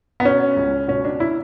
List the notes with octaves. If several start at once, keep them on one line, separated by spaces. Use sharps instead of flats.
B3
B2 C#4
C#2
B2 C#4
D4
E4